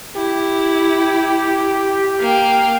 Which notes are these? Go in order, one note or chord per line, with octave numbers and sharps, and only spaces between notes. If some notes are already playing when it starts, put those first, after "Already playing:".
E4 G4
A#3 F5 G5